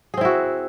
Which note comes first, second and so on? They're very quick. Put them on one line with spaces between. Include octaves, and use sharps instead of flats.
G#4 C4 E4 F#4